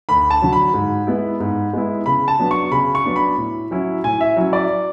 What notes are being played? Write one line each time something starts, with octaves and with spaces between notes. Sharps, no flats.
D2 B5
A5
D3 F#3
B5
G#2
G#3 B3 E4
G#2
G#3 B3 E4
C#3 B5
A5
F#3 B3 D4
C#6
C#3 B5
C#6
F#3 B3 D4
B5
A2
F#3 C#4 E4
A2 G#5
E5
F#3 C#4 E4
D5